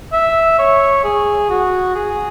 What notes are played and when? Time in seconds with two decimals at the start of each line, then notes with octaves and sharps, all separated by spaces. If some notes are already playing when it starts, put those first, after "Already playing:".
0.13 E5
0.59 C#5
1.04 G#4
1.50 F#4
1.95 G#4